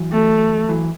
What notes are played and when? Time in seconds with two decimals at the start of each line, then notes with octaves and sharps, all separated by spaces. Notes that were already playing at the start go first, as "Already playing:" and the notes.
Already playing: E3 F#3
0.12 A3
0.69 E3 F#3